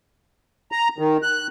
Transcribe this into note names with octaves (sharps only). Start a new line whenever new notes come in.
A#5
D#3
F#6